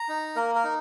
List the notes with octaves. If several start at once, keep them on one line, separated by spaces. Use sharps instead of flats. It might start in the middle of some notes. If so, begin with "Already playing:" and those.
Already playing: A#5
D#4
A#3 A#4
A#4
D#4